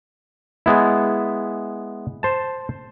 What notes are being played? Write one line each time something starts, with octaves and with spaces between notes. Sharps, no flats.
G#3 B3 E4
C5 A5